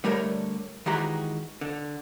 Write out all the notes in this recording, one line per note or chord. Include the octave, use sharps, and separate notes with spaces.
D3 G3 A3 A#4 C#5
D#3 E3 G#3 F#4 G4 A#5
D3